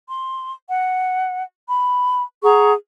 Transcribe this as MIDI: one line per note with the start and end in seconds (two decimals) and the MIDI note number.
0.09 0.52 84
0.69 1.43 78
1.68 2.22 83
2.43 2.71 68
2.43 2.71 78
2.43 2.71 82
2.43 2.71 85